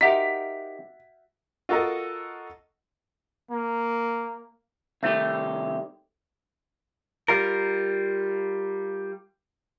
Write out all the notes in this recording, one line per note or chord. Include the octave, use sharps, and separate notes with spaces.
D#4 F#4 G4 A#4 E5 F#5 B6
F4 F#4 A4 A#4 D#5
A#3
C2 D#3 A3 G4
G3 F4 A#4